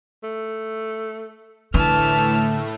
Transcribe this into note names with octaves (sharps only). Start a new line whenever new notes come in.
A3
A2 D3 E3 A3 A5 F6